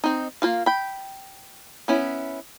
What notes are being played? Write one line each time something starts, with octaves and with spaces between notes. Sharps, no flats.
C4 D#4
A#3 F4 F5
G5 B5
B3 C#4 E4